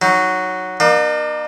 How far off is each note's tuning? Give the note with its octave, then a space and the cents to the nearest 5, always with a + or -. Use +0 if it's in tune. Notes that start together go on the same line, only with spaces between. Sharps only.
F#3 +0 D#4 +15
A#3 +25 D#4 -45